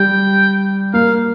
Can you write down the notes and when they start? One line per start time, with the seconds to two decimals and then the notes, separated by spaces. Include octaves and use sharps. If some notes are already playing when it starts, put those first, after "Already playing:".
Already playing: G3 G5
0.94 A#3 F5